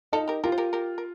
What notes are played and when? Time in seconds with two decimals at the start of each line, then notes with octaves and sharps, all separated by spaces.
0.13 D#4 F4 A4
0.28 G4 A#4
0.44 F4 G4 A#4
0.52 C5
0.58 G4 A#4
0.73 G4 A#4
0.98 A#4